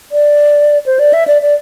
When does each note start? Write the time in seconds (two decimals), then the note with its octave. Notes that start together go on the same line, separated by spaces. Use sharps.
0.12 D5
0.86 C5
0.99 D5
1.13 E5
1.27 D5
1.42 D5